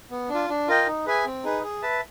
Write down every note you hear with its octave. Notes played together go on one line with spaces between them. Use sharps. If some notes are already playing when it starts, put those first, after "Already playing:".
B3
D4 F4
D4
F4 A#4 D#5 G5
D#4
G#4 B4 E5 G#5
C4
D#4 G#4 B4
G#4
B4 E5 A5